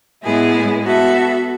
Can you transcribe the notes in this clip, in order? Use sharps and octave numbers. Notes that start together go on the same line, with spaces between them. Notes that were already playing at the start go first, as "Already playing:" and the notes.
A2 G#3 B3 E4 G#4
B3 F#4 A4 E5